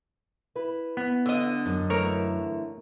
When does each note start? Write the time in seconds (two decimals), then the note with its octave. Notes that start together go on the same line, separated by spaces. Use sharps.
0.55 E4 B4
0.97 B3
1.26 D3 D#5
1.66 F#2
1.90 E3 A3 A#4 C#5